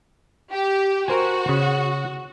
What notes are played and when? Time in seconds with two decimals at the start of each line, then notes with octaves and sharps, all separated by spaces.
0.52 G4
1.08 F#4 A#4 C5 G#5
1.49 C#3